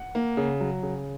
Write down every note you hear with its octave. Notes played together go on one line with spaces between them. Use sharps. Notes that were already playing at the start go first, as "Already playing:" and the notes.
Already playing: F#5
A#3
C#3
F#3
C#3